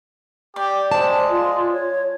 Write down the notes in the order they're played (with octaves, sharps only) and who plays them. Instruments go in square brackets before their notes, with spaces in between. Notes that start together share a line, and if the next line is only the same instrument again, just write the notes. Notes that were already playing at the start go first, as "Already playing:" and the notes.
[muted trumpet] G4 [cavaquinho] D5
[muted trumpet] G#3 [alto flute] C5 [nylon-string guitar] A5
[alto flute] F4
C#5